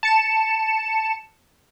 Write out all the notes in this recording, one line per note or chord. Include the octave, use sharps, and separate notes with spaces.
A5 C#7 E7